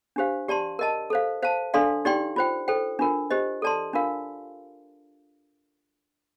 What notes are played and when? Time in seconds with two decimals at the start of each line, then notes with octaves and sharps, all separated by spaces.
0.16 D4 G4 C5 F5
0.48 G4 D5 A5 C6
0.79 A#4 D#5 A5
1.10 A4 C5 F5
1.42 C5 F5 A5
1.74 D4 A4 D5 F5 C6
2.05 D#4 G4 D5 G5 C6
2.36 F4 C5 G5
2.68 A4 C5 G5
2.99 D4 F4 A#4
3.31 G4 C5 D#5
3.62 A4 D5 A5 C6
3.93 D4 F4 A#4 F5